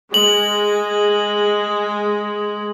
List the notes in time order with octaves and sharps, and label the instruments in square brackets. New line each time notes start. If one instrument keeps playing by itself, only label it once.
[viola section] G#3 [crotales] F#7